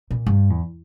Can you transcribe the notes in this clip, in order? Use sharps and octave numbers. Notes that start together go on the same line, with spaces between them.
A#2
G2
E2